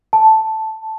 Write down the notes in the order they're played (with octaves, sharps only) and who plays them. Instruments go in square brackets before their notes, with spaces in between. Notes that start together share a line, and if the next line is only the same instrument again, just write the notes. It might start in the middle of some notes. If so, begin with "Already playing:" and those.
[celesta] A5